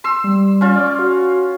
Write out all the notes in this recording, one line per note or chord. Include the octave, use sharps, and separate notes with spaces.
C6 E6
G3
C#4 F4
D5
F#4